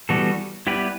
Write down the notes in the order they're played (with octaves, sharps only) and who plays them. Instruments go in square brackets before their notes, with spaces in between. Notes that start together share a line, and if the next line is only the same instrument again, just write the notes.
[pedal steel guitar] E3 G3 B3 F#4 A4
G3 B3 E4 G4 B4